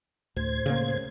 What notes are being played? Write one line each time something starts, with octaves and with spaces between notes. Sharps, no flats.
D2 A2 C5 G#6
C#3 A#3